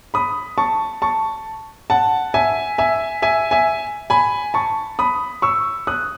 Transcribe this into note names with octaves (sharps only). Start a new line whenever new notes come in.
B5 D#6
A5 C#6
A5 C#6
F#5 A5
E5 G#5
E5 G#5
E5 G#5
E5 G#5
G#5 B5
A5 C#6
B5 D#6
C#6 E6
D#6 F#6